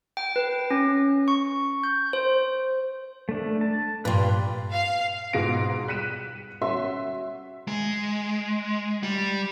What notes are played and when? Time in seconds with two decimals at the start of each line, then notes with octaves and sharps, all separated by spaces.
0.17 G5
0.36 B4
0.71 C#4
1.28 C#6
1.84 G6
2.13 C5
3.29 A3 D4
3.61 A5
4.05 G2 A#2 B4 C6
4.70 F5
5.33 G#2 B2 F4 A#6 D7
5.88 F#6 B6 C#7 D#7 E7
6.61 C#4 F#4 E5 C6
7.68 G#3
9.03 G3